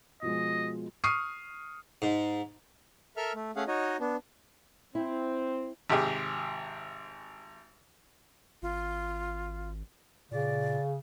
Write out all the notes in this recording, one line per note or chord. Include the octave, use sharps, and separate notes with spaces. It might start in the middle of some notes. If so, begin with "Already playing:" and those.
B2 F3 G#3 D#5
C#6 D#6 F6 C7 D#7
G#2
A4 A#4 E5 F6
A3
A3 C#4 G#4 F5 F#5
D#4 F#4 C#5 D#5
B3 D4
C4 E4
G#1 C3 G4 G#4
G#1 F4
A#2 C#3 D5